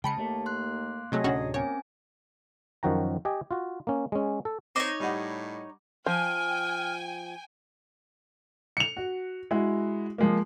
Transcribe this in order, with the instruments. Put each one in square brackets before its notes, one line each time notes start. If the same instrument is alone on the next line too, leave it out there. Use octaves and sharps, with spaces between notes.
[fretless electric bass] C#3 G#3 [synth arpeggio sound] G5 B5 C#7 [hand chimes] A5
[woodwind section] D#2 A#3 [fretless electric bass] A3
[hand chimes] C6 F#6
[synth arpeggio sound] C3 F#3 A3 [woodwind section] G#4 C#5 D#5
[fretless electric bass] D1 C3 D4 [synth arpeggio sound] A2 C#4 F#4
[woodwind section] A#3 [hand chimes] C4 C#4 G#5 [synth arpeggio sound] C#5
[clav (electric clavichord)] F#2 D#3 F3 F#4 G5 A#5
G4 D#5 G5 G#5
F4 F#4
A#3 C#4
G#3 C#4
A4
[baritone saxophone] C4 [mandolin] D#4 C#5 [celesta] D6
[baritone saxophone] A2 [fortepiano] G3 D#5 F#5
[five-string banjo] F3 [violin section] G5 G#5 [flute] F6
[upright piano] C#7 F7
F#4
G#3 E4 F#4
F3 G#3 A#3